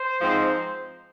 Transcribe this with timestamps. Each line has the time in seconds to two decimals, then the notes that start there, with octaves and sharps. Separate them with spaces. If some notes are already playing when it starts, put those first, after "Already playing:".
Already playing: C5
0.21 G#2 F3 C4 D#4